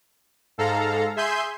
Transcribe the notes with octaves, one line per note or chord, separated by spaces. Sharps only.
G#2 A4 F5 A#5
G#4 E5 G#5 C6 G6